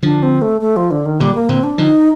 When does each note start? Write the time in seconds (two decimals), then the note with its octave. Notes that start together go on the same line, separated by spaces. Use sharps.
0.03 D3 F3 D4
0.23 C4
0.42 A3
0.61 A3
0.76 F3
0.91 D3
1.06 D#3
1.20 A#2 D3 G3
1.35 A#3
1.49 A#2 D3 C4
1.63 D4
1.78 D3 F3 D#4